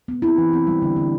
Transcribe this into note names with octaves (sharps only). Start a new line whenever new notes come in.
B3
C4 E4
E3
C4
G3
D3
D3